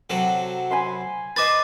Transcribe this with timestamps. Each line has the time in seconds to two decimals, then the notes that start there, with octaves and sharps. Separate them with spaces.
0.10 C3 F#3 A4
0.71 G#5 B5 C6
1.36 B4 C5 D#5 D6 A6